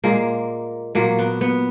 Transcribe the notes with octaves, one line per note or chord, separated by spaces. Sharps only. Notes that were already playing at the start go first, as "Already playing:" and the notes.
A#2 G#3 A#3
A#2 F#3 A#3
B3
B3